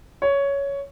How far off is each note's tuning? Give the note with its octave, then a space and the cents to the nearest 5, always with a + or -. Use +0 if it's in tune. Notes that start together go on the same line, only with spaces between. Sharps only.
C#5 +10